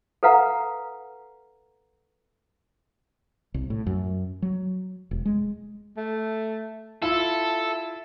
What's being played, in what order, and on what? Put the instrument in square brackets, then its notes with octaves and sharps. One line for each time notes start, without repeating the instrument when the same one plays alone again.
[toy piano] A4 B4 F5 F#5 A#5
[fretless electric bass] C2
A2
F#2
F#3
E1
G#3
[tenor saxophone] A3
[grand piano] E4 F4 [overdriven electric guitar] A4 [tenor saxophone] E5